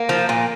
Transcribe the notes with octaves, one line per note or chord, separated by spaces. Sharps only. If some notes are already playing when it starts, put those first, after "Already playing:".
Already playing: A#3
F3
A#2